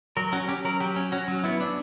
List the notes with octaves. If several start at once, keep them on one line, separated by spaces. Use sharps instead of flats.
F#3 A#4
C#4 F#4
C#4 G4
F#3 A#4
F#3 G4
C#4
C#4 F#4
F#3
B3 E4
D4